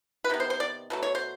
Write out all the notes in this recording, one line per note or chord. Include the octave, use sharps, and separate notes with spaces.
B4
C3 D#3 B3
C5
C5
D5
B2 F#3 A3
C#5
C5